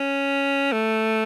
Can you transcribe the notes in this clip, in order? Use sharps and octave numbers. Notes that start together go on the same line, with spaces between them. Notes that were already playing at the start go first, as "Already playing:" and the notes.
Already playing: C#4
A3